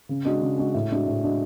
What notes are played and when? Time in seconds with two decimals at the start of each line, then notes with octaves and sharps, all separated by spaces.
0.09 C#3
0.25 G#3 D4 F#4
0.41 C#3
0.58 G#3 D4 F#4
0.74 A2
0.90 G#3 D4 F#4
1.07 A2
1.24 G#3 D4 F#4